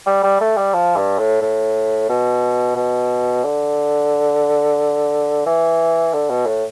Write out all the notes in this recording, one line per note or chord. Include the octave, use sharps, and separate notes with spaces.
G3
G3
A3
G3
F3
G2
A2
A2
B2
B2
D3
E3
D3
B2
A2